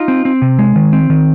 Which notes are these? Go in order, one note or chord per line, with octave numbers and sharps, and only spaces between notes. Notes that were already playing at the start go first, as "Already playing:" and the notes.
Already playing: D#4 F4
C4
C4
C3
G#3
D#3
C4
D#3